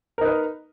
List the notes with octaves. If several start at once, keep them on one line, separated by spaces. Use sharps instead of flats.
D#4 A#4 B4 D#5